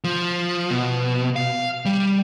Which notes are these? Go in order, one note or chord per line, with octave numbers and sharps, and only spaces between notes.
F3
B2
F5
G3